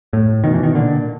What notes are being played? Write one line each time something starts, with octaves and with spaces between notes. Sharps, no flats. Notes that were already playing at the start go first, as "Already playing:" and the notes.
A2
B2 D#3
E3
D#3
A#2 D3